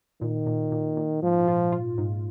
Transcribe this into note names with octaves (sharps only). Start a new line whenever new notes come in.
A#2 D#3
A#2
A#2
A#2
G#2 F3
F4
F4
G#2